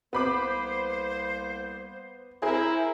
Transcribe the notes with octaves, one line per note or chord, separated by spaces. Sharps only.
C2 A#3 B3 C5 B5 D6
E4 G#4 A#4 C5